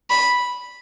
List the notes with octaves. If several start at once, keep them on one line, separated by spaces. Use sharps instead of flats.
B5